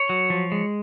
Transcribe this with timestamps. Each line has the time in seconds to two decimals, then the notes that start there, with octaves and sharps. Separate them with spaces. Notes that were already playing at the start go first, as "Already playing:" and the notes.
Already playing: C#5
0.09 F#3
0.30 F3
0.52 G#3